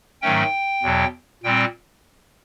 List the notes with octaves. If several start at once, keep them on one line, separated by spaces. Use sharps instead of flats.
G#2 D#3 F#3 A3 C#4 G5
E2 B2 F#3
A#2 G3 C4 G5